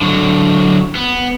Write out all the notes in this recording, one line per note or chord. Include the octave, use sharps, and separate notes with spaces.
D3 F#3
B3